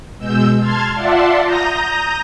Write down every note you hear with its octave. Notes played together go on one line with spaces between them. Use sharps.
B2 G#3 E6 G6
A5 C6 F6 G#6
F4 D5 E5 F#5 A5 C6
A#5 D#6 G6 A#6